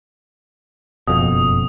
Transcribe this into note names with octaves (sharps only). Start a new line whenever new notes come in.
F#1 F2 B2 D#6